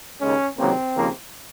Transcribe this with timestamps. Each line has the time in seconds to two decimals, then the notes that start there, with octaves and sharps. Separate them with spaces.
0.20 D#2 C#3 G#3 C#4
0.58 C#2 C3 D#3 F#3 A#3 C4
0.95 D#2 C#3 F3 A#3